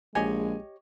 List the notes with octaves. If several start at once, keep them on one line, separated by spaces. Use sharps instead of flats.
A#1 G#3 G4 C#5 D#5 G#5